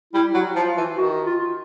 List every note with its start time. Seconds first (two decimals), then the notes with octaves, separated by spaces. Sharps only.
0.13 G3 E4
0.34 F#3
0.55 F3 F4
0.77 E3
0.97 D#3 F#4
1.26 F4